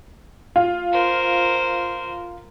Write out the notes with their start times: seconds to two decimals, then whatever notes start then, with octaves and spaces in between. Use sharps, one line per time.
0.56 F4
0.92 A#4 C5